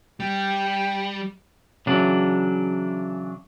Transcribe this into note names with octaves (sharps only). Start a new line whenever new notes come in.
G3 G5
C#3 E3 F#3 D4